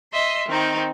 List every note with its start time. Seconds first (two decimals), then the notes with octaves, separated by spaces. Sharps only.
0.12 D#5 E5 C6
0.49 D#3 C4 D#4